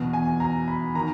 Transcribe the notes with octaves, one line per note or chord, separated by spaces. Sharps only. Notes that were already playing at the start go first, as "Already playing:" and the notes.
Already playing: E2 B2
G#5
A#5
B5
D#3 A#5